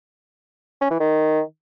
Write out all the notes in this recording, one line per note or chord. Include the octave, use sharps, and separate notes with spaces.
C#4
E3
D#3